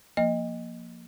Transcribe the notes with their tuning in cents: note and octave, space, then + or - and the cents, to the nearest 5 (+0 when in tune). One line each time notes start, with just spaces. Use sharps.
F3 +0 A#3 +5 D#5 +0